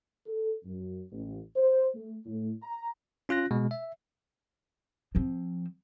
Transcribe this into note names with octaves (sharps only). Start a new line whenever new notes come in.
A4
F#2
A1
C5
A3
A2
A#5
C#4 F4 F#6 A#6
B2 G#3
E5
F3 C4